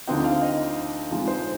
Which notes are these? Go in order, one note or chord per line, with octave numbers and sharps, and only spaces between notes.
D2 D3 F3 C4 D#4 G5
F5
D#5
F2 C3 F3 G#3 D#4
C5